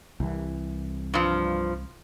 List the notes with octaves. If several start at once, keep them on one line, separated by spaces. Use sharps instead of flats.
C2 E3
G2 F3